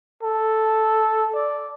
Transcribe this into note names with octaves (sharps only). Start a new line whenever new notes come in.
A4
D5